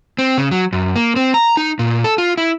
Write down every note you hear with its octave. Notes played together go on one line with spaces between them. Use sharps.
C4
C#3
F#3
F#2
A#3
C4
A#5
D#4
A#2
A4
F4
E4